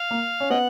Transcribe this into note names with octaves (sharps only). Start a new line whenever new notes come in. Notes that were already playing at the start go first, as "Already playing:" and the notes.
Already playing: F5
A#3
C#4
B3 D#5 F#5